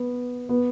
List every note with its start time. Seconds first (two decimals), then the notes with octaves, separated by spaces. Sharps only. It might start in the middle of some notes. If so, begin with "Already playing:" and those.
Already playing: B3
0.49 B3